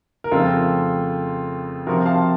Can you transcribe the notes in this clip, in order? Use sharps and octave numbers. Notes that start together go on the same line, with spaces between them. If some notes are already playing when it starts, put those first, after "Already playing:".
A#4
F2 C#3 A3 C4 F4 A4
C3 F3 C4 F#4 A#4
F5 A5